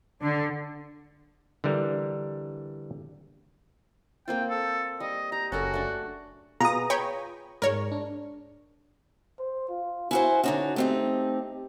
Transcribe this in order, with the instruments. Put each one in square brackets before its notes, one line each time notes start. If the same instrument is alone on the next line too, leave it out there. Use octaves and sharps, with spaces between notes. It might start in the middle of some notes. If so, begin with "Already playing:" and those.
[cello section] D3
[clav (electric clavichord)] D3 E3 G3 A#4
[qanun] A#3 C4 F4 [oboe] G5
[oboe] A4
[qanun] G3 [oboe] D#5
[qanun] G4 [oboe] A#5
[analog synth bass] F#1 [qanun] C#4 A4 A#4 [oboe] F#4
[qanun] A3 D4
[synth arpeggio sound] B2 [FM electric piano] F4 G#4 B4 [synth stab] A#5 D#6
[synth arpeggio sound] C#5 G5 B5
[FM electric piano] G#2 G#3 [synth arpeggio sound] A#4 C#5
[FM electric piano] D4
[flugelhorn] C5
F4
[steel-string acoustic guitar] E4 F#4 C5 [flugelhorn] G#5
[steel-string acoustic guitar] D3 D#4 F#4 [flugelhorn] C#4
[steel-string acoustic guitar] A3 C4 D#4 [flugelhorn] G4